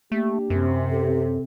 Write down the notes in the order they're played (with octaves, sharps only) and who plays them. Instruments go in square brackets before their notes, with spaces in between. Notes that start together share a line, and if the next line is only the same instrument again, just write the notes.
[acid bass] A3 [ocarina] A#3 [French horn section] D4 G4
[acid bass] F#2 [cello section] C3
[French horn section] D#2 B3 G4 [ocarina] A4